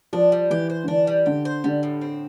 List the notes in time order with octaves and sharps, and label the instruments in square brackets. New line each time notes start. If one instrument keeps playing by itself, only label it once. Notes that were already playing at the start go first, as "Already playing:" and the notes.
[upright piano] F3 [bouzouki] D4
[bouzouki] G3
[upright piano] E3 [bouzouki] G4
[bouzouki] C5
[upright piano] D3
[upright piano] E3 [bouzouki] D4
[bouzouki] G3
[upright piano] D3 [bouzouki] G4
[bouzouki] C5
[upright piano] D3 [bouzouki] G3
[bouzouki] A2
C4